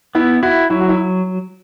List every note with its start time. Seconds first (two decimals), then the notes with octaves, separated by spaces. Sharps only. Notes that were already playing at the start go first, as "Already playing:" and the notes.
0.15 B3 E4
0.43 E4 F#4
0.70 F#3 E4
0.80 F#4
0.89 E4